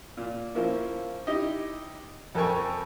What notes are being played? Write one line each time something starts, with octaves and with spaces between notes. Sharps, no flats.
A#2
F3 A#3 C#4 E4
D#4 E4 G4 D#5
F2 A4 A#4 G5 G#5 C#6